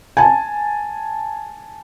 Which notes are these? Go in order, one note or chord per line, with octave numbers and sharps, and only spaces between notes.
G#5 A5